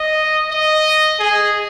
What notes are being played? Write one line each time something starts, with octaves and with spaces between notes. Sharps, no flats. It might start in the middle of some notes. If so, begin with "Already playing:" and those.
Already playing: D#5
D#5
G#4